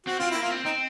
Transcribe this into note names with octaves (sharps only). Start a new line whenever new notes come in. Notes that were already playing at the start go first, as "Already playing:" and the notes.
C4 F#4
C4 F4
A#3 E4
F4
C4
C4 D#4